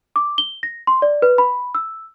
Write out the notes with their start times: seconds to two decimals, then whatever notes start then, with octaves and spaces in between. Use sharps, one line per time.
0.16 D6
0.38 G7
0.63 A#6
0.87 C6
1.02 D5
1.22 B4
1.38 B5
1.75 E6